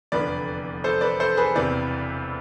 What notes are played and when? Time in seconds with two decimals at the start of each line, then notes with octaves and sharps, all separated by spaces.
0.12 F1 E2 D3 F3 B4 D5
0.84 A4 C5
1.01 B4 D5
1.20 A4 C5
1.37 G#4 B4
1.55 E1 E2 C3 E3 B4 D5